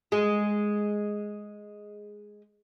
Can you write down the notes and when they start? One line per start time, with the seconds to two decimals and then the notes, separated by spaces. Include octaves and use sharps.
0.12 G#3